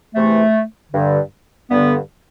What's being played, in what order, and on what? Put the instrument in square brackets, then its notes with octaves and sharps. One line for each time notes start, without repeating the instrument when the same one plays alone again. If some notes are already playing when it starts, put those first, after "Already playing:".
[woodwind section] E2 C3 E3 A3
G2 D3
G2 D3 B3